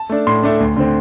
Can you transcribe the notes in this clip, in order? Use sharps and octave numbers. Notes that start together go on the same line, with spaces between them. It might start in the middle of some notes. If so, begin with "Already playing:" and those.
Already playing: A5
A3 D4
A2 C6
A3 D4
D2
D3 C4